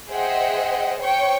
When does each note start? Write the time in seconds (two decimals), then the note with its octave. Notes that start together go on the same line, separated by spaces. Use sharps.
0.11 G#4 C5 D#5 E5 F#5 G5
1.00 C5 C#5 G5 C#6